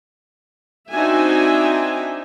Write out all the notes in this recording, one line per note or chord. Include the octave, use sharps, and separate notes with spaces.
C4 D4 D#4 F#4 E5 G#5